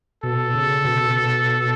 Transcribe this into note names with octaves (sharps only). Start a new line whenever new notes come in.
B2 A4
C#3
B2